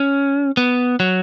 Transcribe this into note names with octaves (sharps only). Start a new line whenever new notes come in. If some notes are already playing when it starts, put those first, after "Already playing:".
Already playing: C#4
B3
F#3